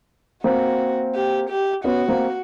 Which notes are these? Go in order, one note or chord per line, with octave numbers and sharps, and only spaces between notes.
A#3 C4 F#4
G4
G4
B3 C#4 F#4
A#3 C4